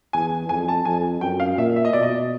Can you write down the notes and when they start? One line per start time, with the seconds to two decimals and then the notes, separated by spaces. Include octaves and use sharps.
0.13 E2 G#5
0.49 F2 G#5
0.68 A5
0.85 F2 G#5
1.21 F#2 G5
1.40 F5
1.58 A#2 E5
1.76 E5
1.85 D#5
1.93 B2 D5
2.03 D#5